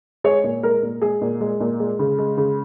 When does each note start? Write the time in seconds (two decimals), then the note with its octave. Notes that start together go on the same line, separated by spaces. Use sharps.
0.24 G#3 G#4 C#5
0.44 A#2
0.63 G#3 A#4
0.83 A#2
1.02 G#3 G#4
1.21 A#2
1.41 G#3
1.60 A#2
1.80 G#3
1.99 C#3
2.18 G#3
2.37 C#3